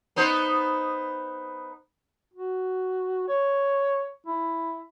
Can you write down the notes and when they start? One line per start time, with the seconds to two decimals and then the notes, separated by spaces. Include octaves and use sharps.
0.16 B3 D#4 C5
2.34 F#4
3.28 C#5
4.27 E4